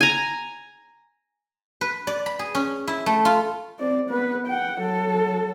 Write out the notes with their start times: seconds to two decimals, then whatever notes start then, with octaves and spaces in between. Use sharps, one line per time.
0.01 G#5 A#5
1.81 B4
2.07 D5
2.26 B5
2.39 G#4
2.55 C#4
2.88 E4
3.06 A3
3.25 F4
3.79 C4 D5
4.10 B3 B4
4.47 F#5 G5
4.80 F#3 A4